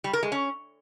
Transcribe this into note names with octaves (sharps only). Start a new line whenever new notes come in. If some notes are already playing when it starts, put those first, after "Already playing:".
G3
A#4
G#3
C#4